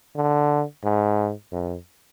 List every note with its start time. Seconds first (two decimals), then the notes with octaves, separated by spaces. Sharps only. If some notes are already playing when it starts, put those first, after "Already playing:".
0.16 D3
0.84 G#2
1.52 F2